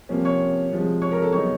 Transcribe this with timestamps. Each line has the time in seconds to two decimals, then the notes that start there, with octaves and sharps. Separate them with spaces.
0.09 C3 F3 A#3 C#4
0.25 C#5 C#6
0.71 C3 F3 G#3
1.02 C#5 C#6
1.12 A#4 A#5
1.22 A4 A5
1.32 C#3 F#3 B3 D#4 C#5 C#6